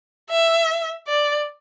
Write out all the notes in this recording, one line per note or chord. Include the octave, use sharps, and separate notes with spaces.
E5
D5